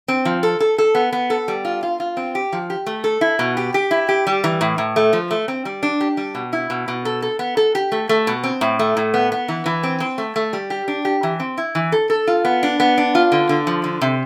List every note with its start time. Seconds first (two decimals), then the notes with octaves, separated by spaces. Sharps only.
0.08 C4
0.25 F3
0.43 A4
0.60 A4
0.78 A4
0.95 B3
1.13 B3
1.30 A4
1.48 G3
1.65 F4
1.83 F4
2.00 F4
2.17 C4
2.35 G4
2.53 F3
2.70 G4
2.86 A3
3.04 A4
3.21 E4
3.39 B2
3.57 G4
3.74 G4
3.91 E4
4.09 G4
4.27 G3
4.44 E3
4.61 A2
4.78 A2
4.96 A3
5.13 F3
5.31 A3
5.48 C4
5.65 G3
5.83 D4
6.00 G4
6.17 G3
6.35 B2
6.53 E4
6.70 B2
6.88 B2
7.05 A4
7.22 A4
7.39 B3
7.57 A4
7.75 G4
7.92 A3
8.09 A3
8.27 B2
8.44 C4
8.61 A2
8.79 A3
8.97 A2
9.14 B3
9.32 B3
9.48 E3
9.66 E3
9.83 C4
10.00 C4
10.18 A3
10.36 A3
10.53 G3
10.70 G4
10.88 D4
11.05 G4
11.23 E3
11.40 C4
11.58 E4
11.75 E3
11.92 A4
12.10 A4
12.27 F4
12.45 B3
12.63 D4
12.80 B3
12.98 D4
13.15 F4
13.32 D3
13.49 D3
13.67 F3
13.84 D3
14.01 C3